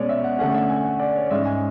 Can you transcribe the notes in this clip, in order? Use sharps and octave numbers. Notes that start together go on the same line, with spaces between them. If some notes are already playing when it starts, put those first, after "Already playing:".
Already playing: B2 G#3 C#4 C#5 D5
E5
F#5
D3 A3 C#4 F#5
E5
G#5
F#5
D5
C#5
D5
G#2 G#3 C#4 E5
G#5